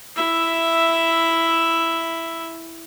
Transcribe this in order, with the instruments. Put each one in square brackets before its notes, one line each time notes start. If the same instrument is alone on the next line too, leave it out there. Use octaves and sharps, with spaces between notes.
[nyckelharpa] E4 E5